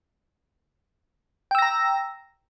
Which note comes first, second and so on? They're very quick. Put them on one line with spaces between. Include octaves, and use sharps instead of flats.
G5 E6 A#6 A#5